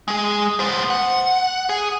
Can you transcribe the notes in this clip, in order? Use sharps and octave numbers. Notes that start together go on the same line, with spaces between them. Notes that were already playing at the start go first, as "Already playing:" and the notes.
G#3 G#4
B3 C5
F#5
G#4